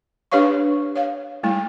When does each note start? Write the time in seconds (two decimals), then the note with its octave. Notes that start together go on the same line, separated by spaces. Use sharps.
0.32 D4 G4 B4 C#5 F5 C#6
0.95 C#5 F5
1.43 G3 A3 E4